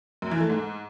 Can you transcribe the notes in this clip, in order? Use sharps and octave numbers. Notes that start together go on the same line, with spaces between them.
F#2
E3
A3
G#2